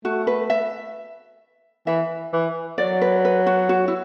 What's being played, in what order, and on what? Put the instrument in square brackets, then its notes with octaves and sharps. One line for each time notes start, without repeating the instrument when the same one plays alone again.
[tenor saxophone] A3 [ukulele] F#4
[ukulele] B4
E5
[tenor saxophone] E3 [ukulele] E5
[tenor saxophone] E3
[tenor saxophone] F#3 [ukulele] D5
[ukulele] B4
B4
F#4
F#4
E4